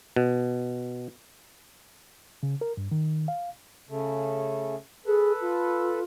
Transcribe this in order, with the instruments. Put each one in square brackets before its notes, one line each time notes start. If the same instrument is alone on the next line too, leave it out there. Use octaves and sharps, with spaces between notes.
[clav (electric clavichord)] B2
[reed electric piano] C#3
A#4
G2
D#3
F5
[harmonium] C#3 A3
[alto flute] G#4 [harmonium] A4 B4
[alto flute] F4